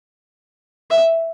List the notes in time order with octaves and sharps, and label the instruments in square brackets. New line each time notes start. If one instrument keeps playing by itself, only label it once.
[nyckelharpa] E5